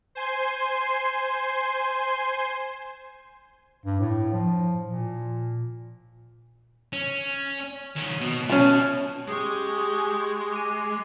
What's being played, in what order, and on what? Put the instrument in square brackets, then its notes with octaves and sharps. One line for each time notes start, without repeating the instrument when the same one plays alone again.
[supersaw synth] C5 G#5 C6
[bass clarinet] G2
A2
F3
A#2
[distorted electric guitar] C#4
D#3 C#4
B2
[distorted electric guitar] B2 [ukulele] C#4 A5
[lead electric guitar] G#3 [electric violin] G4 C#6 [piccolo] D#6
[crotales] D6 D#7